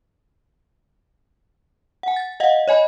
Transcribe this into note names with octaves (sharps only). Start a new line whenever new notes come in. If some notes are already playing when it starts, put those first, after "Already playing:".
F#5 G#5
A6
D#5 F5 F#5
C#5 D#5 G#5 B5